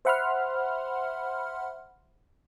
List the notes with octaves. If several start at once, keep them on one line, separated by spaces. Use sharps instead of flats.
C5 E5 F#5 B5 C6 F6